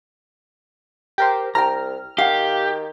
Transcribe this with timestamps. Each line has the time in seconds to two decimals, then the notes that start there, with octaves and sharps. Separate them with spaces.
1.18 G4 A#4 C5
1.55 C2 G5 A#5 F6
2.18 D#3 G4 F5 F#5